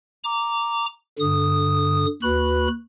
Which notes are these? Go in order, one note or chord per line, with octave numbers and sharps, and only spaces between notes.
A#5 D6
G2 D3 D#6
D#2 F#4 B4 B5 F#6